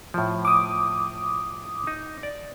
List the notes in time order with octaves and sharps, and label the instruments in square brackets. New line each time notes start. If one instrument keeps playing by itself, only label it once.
[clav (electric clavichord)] A2 F3
[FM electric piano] D6 D#6
[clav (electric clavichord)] D#4
D5